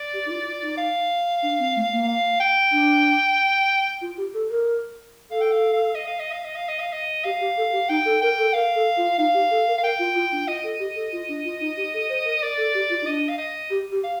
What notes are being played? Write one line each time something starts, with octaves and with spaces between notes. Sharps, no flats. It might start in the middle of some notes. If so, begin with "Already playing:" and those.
Already playing: D5
G4
D#4
F4
F4
D#4
F5
D4
C4
A3
A#3
F5
G5
D4
F4
G4
A4
A#4
A4 F5
G5
F5
F5
D#5
F5
D#5
F5
D#5
F5
D#5
F5
D#5
G4 F5
G4
A4
G4
D#4 G5
A4
A#4 G5
A4
A#4 F5
A4
F4
D#4 F5
G4
A4
A#4
F5
A#4 G5
F4
F4
D4
F4 D#5
A4
G4
A4
F4
D4
F4
D#4
G4
A4
C5
A#4
A#4 D5
A4
G4
F4
D#4
D4 D#5
F5
D#5
G4
G4
F5